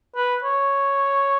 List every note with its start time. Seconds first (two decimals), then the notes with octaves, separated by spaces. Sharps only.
0.16 B4
0.43 C#5